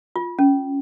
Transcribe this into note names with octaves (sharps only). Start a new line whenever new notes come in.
F4
C#4